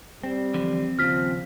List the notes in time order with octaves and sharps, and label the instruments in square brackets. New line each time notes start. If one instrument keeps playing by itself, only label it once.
[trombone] G3 [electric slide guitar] C4
[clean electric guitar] D3 E3 F3
[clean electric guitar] D#2 C#3 [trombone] F3 [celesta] F6 B6